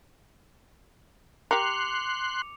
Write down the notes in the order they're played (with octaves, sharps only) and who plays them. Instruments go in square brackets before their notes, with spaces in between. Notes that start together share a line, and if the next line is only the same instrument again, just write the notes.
[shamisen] G4 A#4 [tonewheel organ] C6 F#6 [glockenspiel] D6 C#7 F7